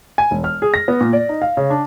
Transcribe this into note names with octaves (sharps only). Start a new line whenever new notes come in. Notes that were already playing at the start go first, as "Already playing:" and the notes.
G#5
E1
F6
G#4
A#6
B3
A#2
D5
D#4
F5
C#3
D4